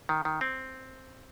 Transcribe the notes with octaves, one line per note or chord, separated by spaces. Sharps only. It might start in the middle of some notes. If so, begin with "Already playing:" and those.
D#3
D#3
C4